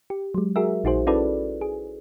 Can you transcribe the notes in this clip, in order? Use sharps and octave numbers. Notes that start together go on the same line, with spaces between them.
G4
F#3 G#3
F#4 G#4 A#4 E5
A#1 D#4 F#4 G#4 C5
C#4 E4 F#4 A4 B4 D5
G#4